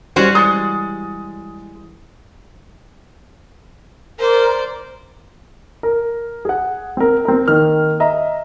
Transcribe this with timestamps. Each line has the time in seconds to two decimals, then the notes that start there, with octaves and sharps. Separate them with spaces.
0.16 E3 G3 C#4 F#4 C5
0.35 G#3 D#6 A6 C#7
4.19 A#4 C5 D5
5.83 A#4
6.45 G#4 F#5
6.97 C4 A#4
7.25 C4 A#4
7.48 D#3 A#3 F6
8.00 D#5 E5 A#5